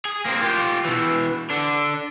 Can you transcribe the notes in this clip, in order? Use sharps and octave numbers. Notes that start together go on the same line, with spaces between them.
G#4
A#3 C4
F4 G4
B2 E3
D3 D4